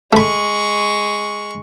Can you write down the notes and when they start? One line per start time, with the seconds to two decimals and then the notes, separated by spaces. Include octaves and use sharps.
0.13 G#3 A3 B5 C#6